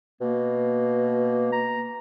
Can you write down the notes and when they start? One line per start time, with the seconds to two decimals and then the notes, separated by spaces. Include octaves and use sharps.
0.21 B2 A#3
1.52 A#5